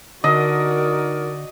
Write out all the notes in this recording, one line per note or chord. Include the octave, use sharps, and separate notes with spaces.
D3 D#4 F#4 A#4 D5 D#5